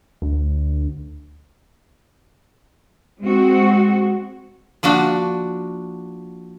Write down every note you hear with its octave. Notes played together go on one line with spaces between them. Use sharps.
D2
G#3 C4 F#4
F3 A#3 D4 F#4